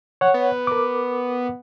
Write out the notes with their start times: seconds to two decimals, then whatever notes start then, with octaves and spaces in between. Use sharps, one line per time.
0.21 C#5 F#5
0.34 B3
0.67 A#4 D6